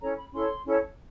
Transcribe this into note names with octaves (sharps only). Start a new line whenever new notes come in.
C#4 E4 A4 C#5 A#5
B5
C#4 E4 A4 C#5 C6
C#4 E4 A4 C#5